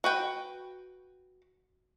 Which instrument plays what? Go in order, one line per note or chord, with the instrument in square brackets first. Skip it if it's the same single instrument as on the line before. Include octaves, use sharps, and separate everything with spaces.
[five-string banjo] F#4 B4 G5